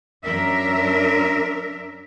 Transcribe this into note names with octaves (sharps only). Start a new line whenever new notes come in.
F#2 D4 A#4 E5